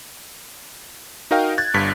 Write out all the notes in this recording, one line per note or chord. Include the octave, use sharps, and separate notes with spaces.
D#4 F#4 A#4 D#5 F5 G5
F#6 G#6 A6
G1 G2 B6